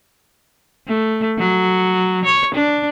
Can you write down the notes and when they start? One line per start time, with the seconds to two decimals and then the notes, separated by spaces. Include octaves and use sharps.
0.88 A3
1.38 F#3
2.25 C#5
2.55 D4